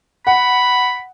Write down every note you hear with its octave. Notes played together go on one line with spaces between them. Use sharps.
F#5 B5